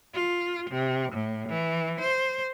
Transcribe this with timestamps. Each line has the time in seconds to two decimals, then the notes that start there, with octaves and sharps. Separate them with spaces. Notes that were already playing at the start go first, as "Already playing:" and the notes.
0.14 F4
0.71 C3
1.14 A2
1.50 E3
2.01 C5